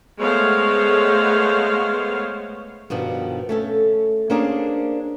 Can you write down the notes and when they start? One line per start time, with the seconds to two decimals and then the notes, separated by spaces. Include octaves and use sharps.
0.18 G#3 A3 B3 C5 C#5 F5
2.90 G2 B2 D#3 F3
3.49 A3 C#4 A4
4.30 A#3 C#4 D4 G#4 A#4 C5